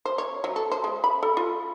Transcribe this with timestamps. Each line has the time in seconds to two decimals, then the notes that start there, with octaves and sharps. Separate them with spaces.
0.05 C5
0.18 C#5
0.44 F#3
0.56 A4
0.72 C5
0.84 G#3
1.04 B5
1.23 A4
1.37 F4